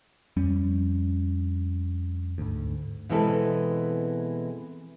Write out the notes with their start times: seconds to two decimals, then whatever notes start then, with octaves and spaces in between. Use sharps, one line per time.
0.37 F2 G3 C#4
2.38 D2 G#2
3.09 B2 E3 G#3 C4 A4 B4